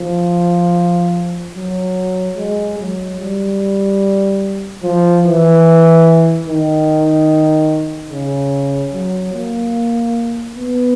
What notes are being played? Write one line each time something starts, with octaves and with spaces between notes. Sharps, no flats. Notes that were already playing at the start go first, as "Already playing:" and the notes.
Already playing: F3
F#3
G#3
F#3
G3
F3
E3
D#3
C#3
F#3
A#3
B3